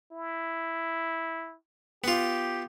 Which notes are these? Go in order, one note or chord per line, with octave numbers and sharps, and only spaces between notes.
E4
B3 F4 G4